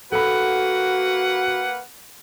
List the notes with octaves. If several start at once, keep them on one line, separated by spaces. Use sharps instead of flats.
A#3 F#4 A4 B4 F#5 B5